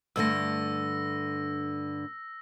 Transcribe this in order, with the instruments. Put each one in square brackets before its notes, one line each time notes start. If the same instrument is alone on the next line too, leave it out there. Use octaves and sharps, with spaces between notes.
[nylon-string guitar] G2 D3 A3 [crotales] E6 A#6